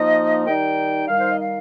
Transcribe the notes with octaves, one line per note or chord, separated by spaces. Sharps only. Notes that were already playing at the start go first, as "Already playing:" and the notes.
Already playing: F3 A#3 D#4 D#5
D#3 G3 D#4 G5
D#3 G3 D#4 F5
C5
D#5
F5